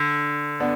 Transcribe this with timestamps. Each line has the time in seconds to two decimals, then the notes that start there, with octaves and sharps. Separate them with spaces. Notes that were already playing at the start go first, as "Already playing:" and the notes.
Already playing: D3
0.60 B3 D4